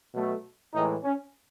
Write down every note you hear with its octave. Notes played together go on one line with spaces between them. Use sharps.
B2 F#3 A3
A2 E3 G#3 D#4
C#4